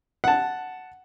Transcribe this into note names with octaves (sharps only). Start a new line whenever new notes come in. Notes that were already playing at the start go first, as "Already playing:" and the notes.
F#5 A5